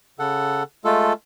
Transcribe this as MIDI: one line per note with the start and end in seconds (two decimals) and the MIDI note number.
0.19 0.63 49
0.19 0.63 69
0.19 0.63 78
0.85 1.13 56
0.85 1.13 57
0.85 1.13 65
0.85 1.13 69